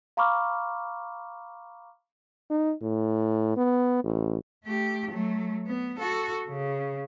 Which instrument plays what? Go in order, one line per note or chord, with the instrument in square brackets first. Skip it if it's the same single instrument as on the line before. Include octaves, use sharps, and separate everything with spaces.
[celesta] F5 A#5 B5 C#6 D6 F6
[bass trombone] D#4
A2
B3
A1
[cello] A3 G4
F#3 A3
B3
F#4 A4
C#3